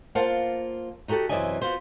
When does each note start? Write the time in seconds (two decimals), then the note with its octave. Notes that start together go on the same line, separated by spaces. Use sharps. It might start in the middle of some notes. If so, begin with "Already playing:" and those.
0.15 A#3 F4 C5 F#5 A5
1.08 D#4 F#4 G4 A4
1.29 F#2 C3 E3 D5 D#5 G#5
1.62 F4 F#4 B4 C5